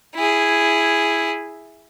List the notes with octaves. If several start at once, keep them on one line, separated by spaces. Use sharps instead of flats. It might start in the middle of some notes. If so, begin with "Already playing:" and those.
E4 G#4